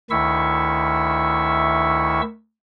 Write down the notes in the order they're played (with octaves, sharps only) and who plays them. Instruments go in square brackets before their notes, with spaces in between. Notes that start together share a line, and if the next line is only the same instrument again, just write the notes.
[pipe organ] D2 D#3 E4 E5 C#6 E6